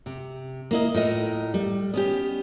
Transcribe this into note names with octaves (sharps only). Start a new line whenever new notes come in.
C3
A#3 E4 D#5
A2 F4 A#4 D#5
G3
B3 C#4 G4